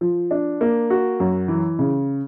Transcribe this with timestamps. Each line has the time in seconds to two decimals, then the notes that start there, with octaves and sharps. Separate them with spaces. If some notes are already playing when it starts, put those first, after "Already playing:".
0.01 F3
0.31 D4
0.61 A#3
0.90 F#4
1.20 F#2
1.48 E3
1.79 C#3